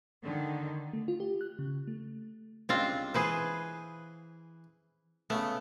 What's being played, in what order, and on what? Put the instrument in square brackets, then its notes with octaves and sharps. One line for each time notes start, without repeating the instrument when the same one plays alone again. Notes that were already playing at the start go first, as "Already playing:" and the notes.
[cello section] D3 D#3
[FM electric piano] A3
F4
G4
F#6
C#3
A3
[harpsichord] C#2 G2 [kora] C4 F4
[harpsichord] E3 [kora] G#4 B4 C5
[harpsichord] C#3 B3 [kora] A3